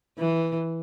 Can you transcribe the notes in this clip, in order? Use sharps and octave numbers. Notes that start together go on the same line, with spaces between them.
E3